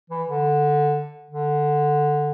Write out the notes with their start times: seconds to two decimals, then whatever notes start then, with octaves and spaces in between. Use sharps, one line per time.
0.10 E3
0.27 D3
1.30 D3